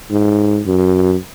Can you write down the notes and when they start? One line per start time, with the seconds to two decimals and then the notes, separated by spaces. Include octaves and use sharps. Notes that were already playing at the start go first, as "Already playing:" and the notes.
0.11 G#2
0.66 F#2